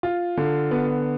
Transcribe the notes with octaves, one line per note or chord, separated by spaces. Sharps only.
F4
D3
B3